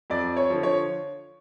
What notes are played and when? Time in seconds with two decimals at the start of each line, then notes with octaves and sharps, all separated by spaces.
0.10 F2 D5
0.37 C#5
0.50 D3 F3
0.63 C#5